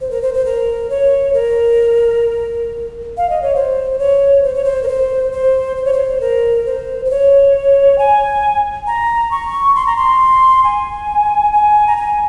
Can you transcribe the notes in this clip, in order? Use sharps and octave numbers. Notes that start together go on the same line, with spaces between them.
C5
A#4
C5
C5
A#4
C#5
A#4
F5
D#5
C#5
C5
C#5
C5
C#5
C5
A#4
C5
C5
C5
C#5
C5
A#4
C5
C5
C#5
G#5
A#5
C#6
C6
A#5
C6
G#5
G#5
A#5
G#5